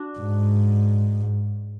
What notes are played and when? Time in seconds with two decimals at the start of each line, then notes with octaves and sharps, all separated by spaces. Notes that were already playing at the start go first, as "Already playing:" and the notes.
Already playing: D4 F#4
0.19 G#2